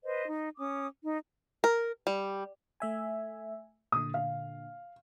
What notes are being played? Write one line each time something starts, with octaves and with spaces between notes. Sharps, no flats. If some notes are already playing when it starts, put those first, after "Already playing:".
B4 C5 D#5
D#4
C#4 D6 D#6
D#4
A#4
G3
A3 E5 G#5
A#2 D3 D#6
F5